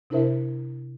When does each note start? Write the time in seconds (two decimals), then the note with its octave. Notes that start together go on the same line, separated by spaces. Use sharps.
0.10 C3 D4 E4 A#4 C5 E5